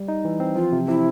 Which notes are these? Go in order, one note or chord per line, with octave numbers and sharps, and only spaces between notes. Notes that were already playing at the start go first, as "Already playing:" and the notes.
Already playing: G3
D#4
E3
C4
F3 F4
C3
C3 E4